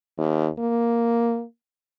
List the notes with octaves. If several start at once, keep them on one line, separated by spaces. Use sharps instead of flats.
D#2
A#3